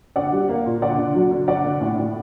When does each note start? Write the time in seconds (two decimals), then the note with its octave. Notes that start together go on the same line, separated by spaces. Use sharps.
0.16 D3 D5 F#5
0.33 G3
0.49 A#3
0.66 A#2
0.82 D3 D5 F#5
0.98 D3
1.15 F#3
1.31 D3
1.48 D3 D5 F#5
1.65 D3
1.81 A2
1.98 A2